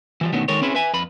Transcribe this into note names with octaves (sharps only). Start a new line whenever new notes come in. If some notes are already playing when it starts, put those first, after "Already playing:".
E3 F3 G3
B2 D3 D#3 F#3 A3 B3
D#3 G#3 A4 A#4 C#5
C4 C#4 E4 G#4 B4
B4 E5 G#5
F2 B4 B5